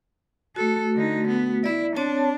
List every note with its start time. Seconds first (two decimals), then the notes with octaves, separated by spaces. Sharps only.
0.56 A3 F#4 A4
0.94 D3 D#4
1.28 B3
1.64 E4 D5 E5
1.97 C4 D4 C#5 A5